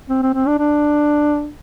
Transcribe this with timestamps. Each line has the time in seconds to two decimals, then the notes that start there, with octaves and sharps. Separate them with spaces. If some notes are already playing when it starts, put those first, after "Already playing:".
0.09 C4
0.22 C4
0.34 C4
0.47 D4
0.59 D4